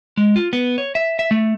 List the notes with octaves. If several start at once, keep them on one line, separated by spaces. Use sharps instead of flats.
G#3
F4
B3
C#5
E5
E5
A3